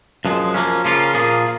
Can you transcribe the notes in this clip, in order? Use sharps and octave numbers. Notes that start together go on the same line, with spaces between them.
F#2 F3 G#3
F3 A#3 C#4
C#3 F3 A#3 C#4 F4
A#2 F3 A#3 F4 G#4